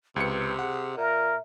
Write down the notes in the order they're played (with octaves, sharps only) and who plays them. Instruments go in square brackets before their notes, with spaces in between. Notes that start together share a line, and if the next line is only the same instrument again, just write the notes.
[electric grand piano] C#2 C#7 [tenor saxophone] C3 [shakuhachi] B4
[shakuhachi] G#4 [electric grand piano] F#5
[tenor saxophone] A#2 [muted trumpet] A#4 [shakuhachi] E5